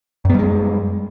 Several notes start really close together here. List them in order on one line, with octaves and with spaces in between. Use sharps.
F#2 B3 G3 G#3